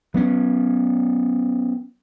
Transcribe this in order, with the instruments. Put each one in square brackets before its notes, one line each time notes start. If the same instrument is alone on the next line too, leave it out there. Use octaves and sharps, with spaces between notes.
[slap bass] F#3 B3 C#4